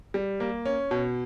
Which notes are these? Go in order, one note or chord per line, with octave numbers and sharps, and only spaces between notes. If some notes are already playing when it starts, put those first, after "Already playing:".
G3
A#3
C#4
B2